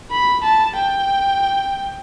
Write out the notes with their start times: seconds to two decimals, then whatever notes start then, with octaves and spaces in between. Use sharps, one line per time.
0.11 B5
0.44 A5
0.76 G5